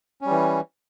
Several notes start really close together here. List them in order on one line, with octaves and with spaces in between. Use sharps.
C#4 G3 E3